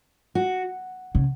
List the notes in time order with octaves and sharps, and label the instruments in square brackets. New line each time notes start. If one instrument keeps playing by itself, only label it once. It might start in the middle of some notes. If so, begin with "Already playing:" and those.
[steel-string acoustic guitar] F#4
[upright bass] C#3